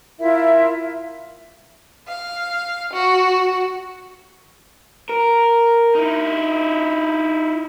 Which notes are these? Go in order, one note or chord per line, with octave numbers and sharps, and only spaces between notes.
E4 F4 A#4 E5
F5
F#4
A#4
D#4 E4